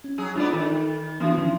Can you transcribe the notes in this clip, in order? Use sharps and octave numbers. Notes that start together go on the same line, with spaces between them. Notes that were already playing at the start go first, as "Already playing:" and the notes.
C#4
F#3 G#4
G#2 B3 D4 F4 D5
D#3 A4
E3 B3 D4 F#4
D#3 F3 C#4